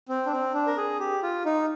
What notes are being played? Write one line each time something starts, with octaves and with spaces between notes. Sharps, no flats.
C4
D4
C4
D4
A#4
G#4
G4
F4
D#4